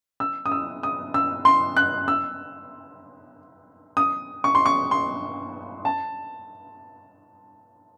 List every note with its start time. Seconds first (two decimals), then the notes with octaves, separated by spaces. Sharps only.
0.20 E6
0.46 D#6
0.52 E6
0.83 D#6
1.14 E6
1.45 C6
1.77 F#6
2.08 E6
3.97 D#6
4.44 C#6
4.55 C6
4.66 C#6
4.91 C6
5.85 A5